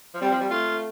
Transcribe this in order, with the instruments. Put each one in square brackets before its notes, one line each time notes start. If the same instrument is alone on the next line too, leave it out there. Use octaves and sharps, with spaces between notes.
[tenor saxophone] F3
[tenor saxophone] G3 [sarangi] C4
[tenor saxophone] F3
G3
[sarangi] A3 [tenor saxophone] F4